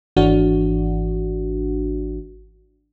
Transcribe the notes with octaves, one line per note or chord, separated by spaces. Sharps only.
G#1 E3 D4 F#4